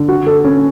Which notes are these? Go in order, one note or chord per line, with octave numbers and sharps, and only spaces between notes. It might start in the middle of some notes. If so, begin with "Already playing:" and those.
Already playing: D3
F#4
A4
C#4